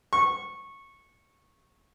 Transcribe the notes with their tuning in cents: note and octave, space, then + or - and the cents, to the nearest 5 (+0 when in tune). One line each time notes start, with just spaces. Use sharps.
C#6 -15